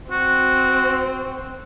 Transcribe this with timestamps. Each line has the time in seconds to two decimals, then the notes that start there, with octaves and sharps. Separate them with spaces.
0.11 C4 F#4